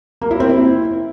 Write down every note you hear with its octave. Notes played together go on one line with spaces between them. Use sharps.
A#3
E4
C4
E4